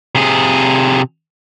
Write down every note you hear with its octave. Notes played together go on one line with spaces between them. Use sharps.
C3 G#4